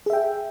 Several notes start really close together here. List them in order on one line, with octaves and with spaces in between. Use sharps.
G#4 E5 G5